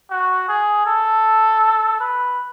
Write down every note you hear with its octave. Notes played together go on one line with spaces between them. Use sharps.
F#4
G#4
A4
B4